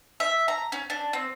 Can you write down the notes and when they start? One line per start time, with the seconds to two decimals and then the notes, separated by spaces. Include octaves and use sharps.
0.20 E5
0.48 A#5
0.72 C#4
0.90 D4
1.13 C4